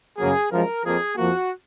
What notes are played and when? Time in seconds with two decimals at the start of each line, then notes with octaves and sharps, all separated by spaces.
0.18 F#2 C#3 F#3 A#3 G#4
0.51 F#2 F3 G#3 A#4
0.84 F2 F3 A#3 G#4
1.17 F2 F3 A#3 F#4